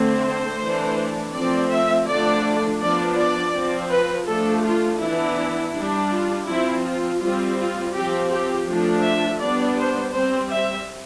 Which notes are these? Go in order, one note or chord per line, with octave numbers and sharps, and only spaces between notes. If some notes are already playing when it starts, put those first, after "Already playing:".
Already playing: D3 A3 C4
C5
E3 A3 D4
F3 A3 C4 D5
E5
D3 F3 A3 D4 D5
F3 B3 D4 D5
D5
F3 C4
B4
F3 A3 D4 A4
F4
E3 B3 D4 E4
G3 D4
F4
F3 C4 E4
F4
G3 C4 F4
F4
F3 C4 G4
G4
F3 A3 D4
E5
G3 B3 D4 D5
C5
G3 C4 C5
E5